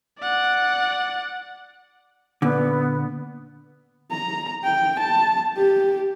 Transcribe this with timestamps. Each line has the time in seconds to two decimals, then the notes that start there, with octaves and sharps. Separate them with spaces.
0.20 D5 F#5
2.42 A#2 D3 B3
4.11 A#5
4.64 G5
4.99 A5
5.57 G4